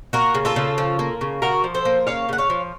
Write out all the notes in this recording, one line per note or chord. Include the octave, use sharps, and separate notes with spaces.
A#3 F#4 A#4
C#3
F4 A4
C#3
F3
A#3
C#3
C#3 F#4 A#4
F3
A4 C5
A#3
C#3 C#5 F5
C#3 F#5
C#5 F5
F3